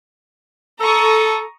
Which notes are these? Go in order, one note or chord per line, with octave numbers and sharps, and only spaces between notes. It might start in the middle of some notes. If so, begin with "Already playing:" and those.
A4 A#5 C#6 D#6